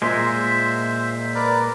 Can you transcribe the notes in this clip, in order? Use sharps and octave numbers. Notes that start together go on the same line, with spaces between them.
A#2 G#3 C5 E5
A#4 B4 D5